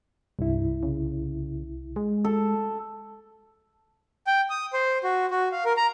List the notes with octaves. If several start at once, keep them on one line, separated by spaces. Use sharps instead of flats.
C2 G2 E4
C#3
G#3
A4
G5
D#6
C5
F#4
F#4
F5
A#4
A#5